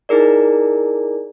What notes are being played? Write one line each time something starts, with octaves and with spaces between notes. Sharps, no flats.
D#4 E4 G#4 A#4 D5